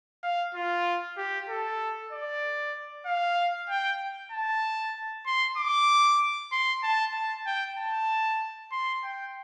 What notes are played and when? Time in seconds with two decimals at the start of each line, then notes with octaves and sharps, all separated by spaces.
0.23 F5
0.55 F4
1.18 G4
1.49 A4
2.12 D5
3.06 F5
3.69 G5
4.32 A5
5.26 C6
5.57 D6
6.52 C6
6.84 A5
7.15 A5
7.46 G5
7.78 A5
8.72 C6
9.04 G5